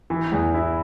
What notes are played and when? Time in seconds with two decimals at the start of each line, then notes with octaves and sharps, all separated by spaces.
0.10 E3
0.32 E2
0.54 E4